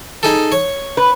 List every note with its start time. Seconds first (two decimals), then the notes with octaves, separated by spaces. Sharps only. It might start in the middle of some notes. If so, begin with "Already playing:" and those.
0.23 D#4 G#4 A4
0.52 C#5
0.97 B4